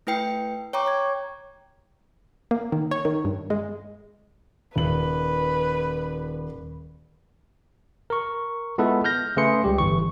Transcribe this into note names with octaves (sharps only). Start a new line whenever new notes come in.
A3 E4 B4 G5 C7 C#7
C#5 G5 A#5 C#6 D6
C#5 G#6
A#3
D#3
C#5
D#3
G2
G#3
D#1 B4 F#7
A#4 C#6
G#3 B3 E4 F4 A4 B4
F6 G6 A#6
C#3 A3 G#4 B4 C6 C#7
C#2 G3 G4
G1 E3 C#6